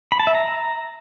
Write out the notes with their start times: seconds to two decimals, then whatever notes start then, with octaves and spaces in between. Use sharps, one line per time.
0.12 B5
0.19 A5
0.27 E5
0.35 A#5